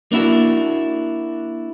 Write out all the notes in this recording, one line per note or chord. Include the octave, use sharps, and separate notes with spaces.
A#3 D4 E4 F#4